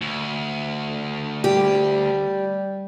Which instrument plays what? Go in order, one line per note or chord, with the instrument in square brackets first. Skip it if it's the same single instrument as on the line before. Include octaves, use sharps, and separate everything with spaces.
[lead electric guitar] D2
[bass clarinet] G3 [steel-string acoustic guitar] G4